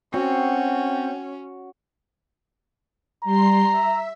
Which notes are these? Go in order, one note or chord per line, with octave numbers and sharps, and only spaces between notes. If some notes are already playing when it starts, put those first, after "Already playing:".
C4 C#4 F#4
G3 A#5 C6 C7
E5